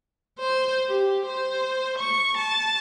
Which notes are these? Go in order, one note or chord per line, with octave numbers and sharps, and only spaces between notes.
C5
G4
C5
C#6
A5